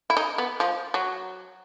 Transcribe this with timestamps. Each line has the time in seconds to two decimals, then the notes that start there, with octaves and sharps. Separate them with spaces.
0.10 E4
0.17 D#4
0.38 B3
0.60 F3
0.94 F#3